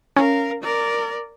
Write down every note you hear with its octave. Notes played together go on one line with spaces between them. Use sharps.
C#4 A#4 F5
A#4 D5